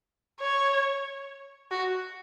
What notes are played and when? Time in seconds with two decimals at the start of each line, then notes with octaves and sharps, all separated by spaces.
0.40 C#5
1.71 F#4